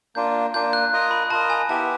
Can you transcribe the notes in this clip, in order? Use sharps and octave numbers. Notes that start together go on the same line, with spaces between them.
A#3 D4 F4 G6
A#3 D4 F4 G6
F#6
F4 A#4 D#5
B5
F4 A#4 D#5 A5
G#5
B3 E4 G4 A5